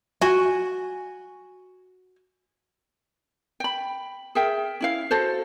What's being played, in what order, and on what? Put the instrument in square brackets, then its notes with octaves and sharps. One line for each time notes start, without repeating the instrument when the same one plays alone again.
[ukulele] F#4 G#5
G5 B5
G#4 A#4 E5 G5
C#4 E4 F5
F#4 A4 C5